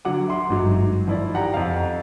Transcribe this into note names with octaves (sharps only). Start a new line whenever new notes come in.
D3 F#3 F#5 D6
E5 C6 D6
G1 G#2 F#3
D#3 F3 E4 D5
G4 F#5 G5 A#5
F2 F5